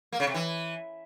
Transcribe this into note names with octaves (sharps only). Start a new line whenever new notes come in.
A#3
C#3
C3
E3